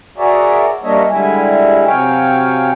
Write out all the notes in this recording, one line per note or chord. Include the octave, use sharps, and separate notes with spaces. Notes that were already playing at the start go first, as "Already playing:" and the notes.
F#4 G#4 A#4 C#5 D5 E5
G3 A#3 D4 C#5 D#5 E5
D3 G3 G#3 E4 E5 G#5
C3 F#3 C#5 F5 G5 G#5